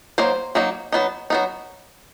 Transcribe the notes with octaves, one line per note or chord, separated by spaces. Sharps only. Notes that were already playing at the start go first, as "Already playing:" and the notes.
F#3 A#3 D#4 C5
F#3 A#3 D#4
F#3 B3 D#4
F#3 B3 D#4